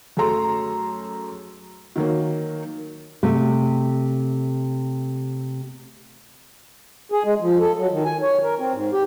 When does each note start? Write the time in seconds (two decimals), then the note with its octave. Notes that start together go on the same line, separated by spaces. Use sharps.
0.17 F#2 A3 G#4 A4 A#5 C6
1.96 D#3 F#3 A#3
3.23 C3 A3
7.12 G#4
7.25 G#3
7.40 F3
7.59 A4
7.78 F#3
7.92 D#3
8.05 G#5
8.22 C#5
8.43 A#4
8.59 C4
8.73 G#2
8.93 G4